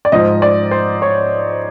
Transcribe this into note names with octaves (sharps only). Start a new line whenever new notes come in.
D5
G#2 F3 D#5
D5
C5
C#5